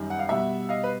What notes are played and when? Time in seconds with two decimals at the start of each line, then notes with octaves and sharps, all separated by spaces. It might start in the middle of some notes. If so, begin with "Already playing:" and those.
Already playing: F#2 D#3 G3
0.10 F#5
0.19 F5
0.29 B2 G3 E5 F#5
0.69 D#5 F5
0.84 B4